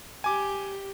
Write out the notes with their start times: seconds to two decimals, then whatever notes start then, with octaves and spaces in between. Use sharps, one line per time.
0.24 G4 G#5 D6